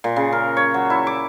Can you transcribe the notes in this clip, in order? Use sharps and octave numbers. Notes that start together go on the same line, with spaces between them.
A#2
C#3
A#4
C#5
F#3
E4
D6